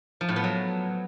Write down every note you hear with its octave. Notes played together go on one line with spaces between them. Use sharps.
F3
A2
B3
F#3